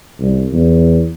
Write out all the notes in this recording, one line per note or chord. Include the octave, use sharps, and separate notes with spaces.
C2
E2